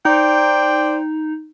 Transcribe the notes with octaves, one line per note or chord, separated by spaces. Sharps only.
D#4 C5 D5 G5